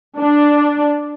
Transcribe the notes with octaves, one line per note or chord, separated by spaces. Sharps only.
D4